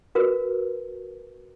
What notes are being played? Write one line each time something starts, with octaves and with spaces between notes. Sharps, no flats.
F#4 A#4 B4